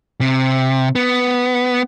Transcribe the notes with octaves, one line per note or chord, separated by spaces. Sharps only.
C3
B3